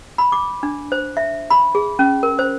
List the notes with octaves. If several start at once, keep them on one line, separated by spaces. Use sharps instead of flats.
B5
D6
D4
C5
E5
B5
G#4
C#4
A#4
C5